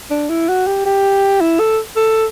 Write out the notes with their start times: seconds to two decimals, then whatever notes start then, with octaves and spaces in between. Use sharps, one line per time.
0.10 D4
0.29 E4
0.49 F#4
0.67 G4
0.85 G4
1.41 E4
1.59 A4
1.96 A4